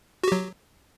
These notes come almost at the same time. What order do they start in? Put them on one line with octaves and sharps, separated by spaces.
F#4 G4 F#3